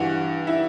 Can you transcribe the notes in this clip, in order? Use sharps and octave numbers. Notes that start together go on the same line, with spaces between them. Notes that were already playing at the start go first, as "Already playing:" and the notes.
Already playing: G2 E3 F#4
E4